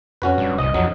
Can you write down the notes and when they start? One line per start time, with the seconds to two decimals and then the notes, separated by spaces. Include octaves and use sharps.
0.22 F2 C#4 F#4 B4
0.38 D1 G2
0.58 C2 D#5
0.74 A#1 F2 F#3